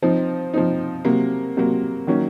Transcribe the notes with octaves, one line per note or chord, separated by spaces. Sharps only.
F3 C4 D#4
F3 C4 D#4
C3 F#3 A#3
C3 F#3 A#3
D#3 F#3 A#3 C#4